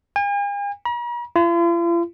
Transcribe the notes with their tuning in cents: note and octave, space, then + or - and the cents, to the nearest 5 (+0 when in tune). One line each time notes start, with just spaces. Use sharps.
G#5 -45
A#5 +45
F4 -45